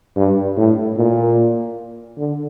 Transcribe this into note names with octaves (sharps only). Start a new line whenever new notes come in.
G2
A2
A#2
D3